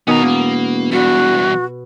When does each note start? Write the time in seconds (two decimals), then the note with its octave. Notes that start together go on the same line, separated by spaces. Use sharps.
0.07 B2 D#3 C#4 A#5 D#6
0.23 E1 A#3
0.92 E2 G2 F#4